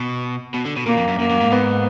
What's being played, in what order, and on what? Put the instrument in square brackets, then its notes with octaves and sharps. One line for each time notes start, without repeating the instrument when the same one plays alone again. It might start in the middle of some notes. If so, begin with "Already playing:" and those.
Already playing: [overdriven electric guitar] B2
B2
D3
B2
[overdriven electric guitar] A#2 [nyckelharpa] A#3
[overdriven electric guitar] F2
F#2
[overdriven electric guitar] F#2 [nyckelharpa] A#3
[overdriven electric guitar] F#2
G#2
[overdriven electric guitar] G#2 [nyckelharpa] B3